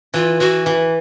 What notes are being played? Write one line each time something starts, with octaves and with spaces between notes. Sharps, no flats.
E3 F4
E3 F#4
E3